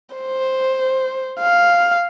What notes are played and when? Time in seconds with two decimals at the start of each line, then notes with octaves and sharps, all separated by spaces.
0.15 C5
1.41 F5